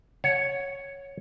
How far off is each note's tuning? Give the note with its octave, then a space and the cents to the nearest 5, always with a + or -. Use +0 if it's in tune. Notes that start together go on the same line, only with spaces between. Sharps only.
C#5 +0 F#5 -25 A5 -25